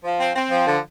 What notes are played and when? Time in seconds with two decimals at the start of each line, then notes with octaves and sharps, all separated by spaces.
0.04 F3
0.20 C4
0.36 C4
0.51 F3
0.67 D3